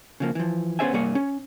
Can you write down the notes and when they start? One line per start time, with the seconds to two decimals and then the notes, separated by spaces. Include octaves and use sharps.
0.20 C#3 F3 A#3
0.35 E3 F3
0.79 B3 C#4 G#4 C5 E5 G#5
0.93 C2 G2 A#3 G#4 C#5
1.15 C#4